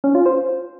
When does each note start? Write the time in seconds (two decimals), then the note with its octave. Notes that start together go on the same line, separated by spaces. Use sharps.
0.04 C#4
0.15 F4
0.26 C5